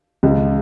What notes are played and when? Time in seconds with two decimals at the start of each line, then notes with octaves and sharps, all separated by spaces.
0.23 C#2